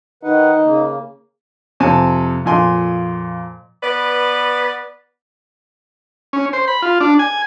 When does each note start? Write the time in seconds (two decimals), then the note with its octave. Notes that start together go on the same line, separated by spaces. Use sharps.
0.23 D#3 D#4 B4 F#5
0.64 C#3 A#3
1.80 F2 C3 G#5 A5
2.45 F2 A#2 G#5 C6
3.82 B3 B4 D5
6.33 C#4
6.53 C5
6.68 B5
6.82 F4
7.00 D4
7.19 G#5